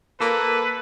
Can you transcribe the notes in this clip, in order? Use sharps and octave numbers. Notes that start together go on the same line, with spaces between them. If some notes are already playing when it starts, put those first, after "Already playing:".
A#3 A4 B4